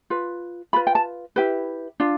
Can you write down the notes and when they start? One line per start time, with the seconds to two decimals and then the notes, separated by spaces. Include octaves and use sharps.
0.10 F4 B4
0.73 F4 B4 B5
0.87 G5
0.95 A5
1.36 E4 G4 B4
2.00 D4 F4